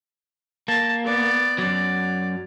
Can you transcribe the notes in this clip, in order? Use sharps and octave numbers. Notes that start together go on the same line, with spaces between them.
A#3 A5
B3 D5
F#2 F#3 D5